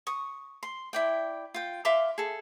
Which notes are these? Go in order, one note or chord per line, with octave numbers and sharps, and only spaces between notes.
C#6 D#6
C6
E4 D5 G5
F4 G5
E5 F5 C6 D6
G#4 A4